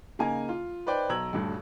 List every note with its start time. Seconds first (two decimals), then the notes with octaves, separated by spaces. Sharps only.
0.19 C#3 A#3 D#4 G#5 A#5
0.49 F4
0.86 D#4 B4 C5 D5 G5
1.09 B1 A#5 E6 G#6 F#7
1.33 D#1 D2 G2